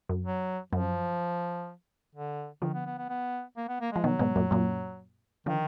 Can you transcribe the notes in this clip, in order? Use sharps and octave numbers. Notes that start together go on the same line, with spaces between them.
F#2
F#3
F#2 F3
D3
D3 D#3 F3
B3
B3
B3
B3
A#3
B3
A#3
G#3
F3
B2 D#3 F#3
G#2 B2
F#2 A#2
F#2 A#2
D3 D#3 F3